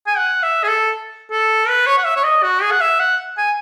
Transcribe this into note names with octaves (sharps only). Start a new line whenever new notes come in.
G#5
F#5
E5
G#4
A4
A4
B4
C#5
F#5
E5
C#5
D#5
F#4
G#4
F#5
E5
F#5
G#5